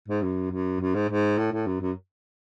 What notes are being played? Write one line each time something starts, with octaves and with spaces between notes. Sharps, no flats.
G#2
F#2
F#2
F#2
G#2
G#2
A2
A2
F#2
F#2